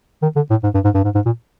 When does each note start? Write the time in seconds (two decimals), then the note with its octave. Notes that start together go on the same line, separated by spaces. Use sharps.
0.23 D#3
0.36 D3
0.50 A2
0.63 G#2
0.74 G2
0.84 G#2
0.95 G2
1.04 G#2
1.15 G#2
1.25 A#2